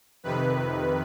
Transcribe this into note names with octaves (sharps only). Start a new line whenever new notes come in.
F2 C3 D#3 B4